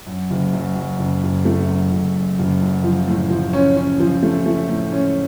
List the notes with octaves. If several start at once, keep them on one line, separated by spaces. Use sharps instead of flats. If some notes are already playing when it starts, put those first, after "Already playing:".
F#2
F#1
F#2
F#2
F#1
F#1
A3
F#2
F#1
F#2
F#1
F#2
F3
A2
F3
C#4
C#4
F3
A3
A3
A2
C#4